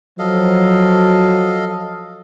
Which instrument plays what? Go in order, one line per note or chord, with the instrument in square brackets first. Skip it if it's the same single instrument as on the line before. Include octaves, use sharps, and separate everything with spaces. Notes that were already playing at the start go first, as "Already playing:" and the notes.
[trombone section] F3 F#3 [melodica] A4 D#5 F5